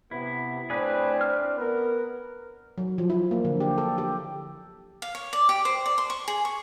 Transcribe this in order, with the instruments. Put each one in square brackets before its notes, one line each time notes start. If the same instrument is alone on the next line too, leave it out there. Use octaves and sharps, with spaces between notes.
[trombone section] C3 B3 [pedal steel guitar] E4
[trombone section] A2 C4 [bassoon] D4 [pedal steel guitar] G#4 B4
[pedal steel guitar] F6
[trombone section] B3 A#4 [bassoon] B4
[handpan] F#3
F3
E4
A#3
D3
G4
A4
G4
[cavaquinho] F5
C#5
D5
G4
C5
D5
C6
C#6
G#4
C#6